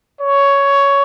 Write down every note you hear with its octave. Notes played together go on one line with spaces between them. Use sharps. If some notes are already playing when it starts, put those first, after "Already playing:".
C#5